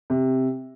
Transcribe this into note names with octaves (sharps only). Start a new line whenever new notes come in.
C3